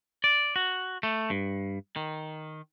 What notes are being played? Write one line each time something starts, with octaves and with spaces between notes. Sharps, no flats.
D5
F#4
A3
G2
D#3